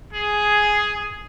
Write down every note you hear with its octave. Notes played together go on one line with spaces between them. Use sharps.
G#4